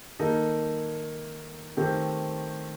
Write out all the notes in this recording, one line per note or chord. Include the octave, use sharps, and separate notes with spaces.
D#3 A#3 D#4 A4
D#3 A3 C4 G4